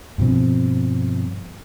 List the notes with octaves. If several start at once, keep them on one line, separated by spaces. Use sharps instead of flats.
G2 B2 F3 C4